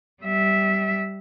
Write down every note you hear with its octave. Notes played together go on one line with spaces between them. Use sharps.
G3 E5